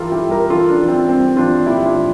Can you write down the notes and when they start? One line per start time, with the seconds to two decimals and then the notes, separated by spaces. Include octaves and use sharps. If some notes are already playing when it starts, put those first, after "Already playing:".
Already playing: E3 G3 F4 G4 A4 A#4
0.12 E4 G4
0.21 G3
0.31 G4 A#4
0.50 E3 F4 A4
0.69 D4
0.79 E3
0.88 C4
1.09 G3 C4
1.37 E3 D4 F4
1.66 A#2 E4 G4
1.86 D4 F4
1.95 F3